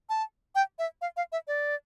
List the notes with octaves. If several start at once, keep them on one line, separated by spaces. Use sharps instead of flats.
A5
G5
E5
F5
F5
E5
D5